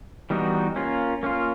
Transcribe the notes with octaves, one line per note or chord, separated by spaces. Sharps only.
E3 G3 B3 D#4 F#4
A#3 C#4 F4
A#3 C#4 F4